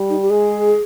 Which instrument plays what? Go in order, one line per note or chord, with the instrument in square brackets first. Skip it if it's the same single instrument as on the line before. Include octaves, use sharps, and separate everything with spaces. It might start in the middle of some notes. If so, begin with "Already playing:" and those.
Already playing: [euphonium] G3
[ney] D#4
G4
[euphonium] G#3 [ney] G#4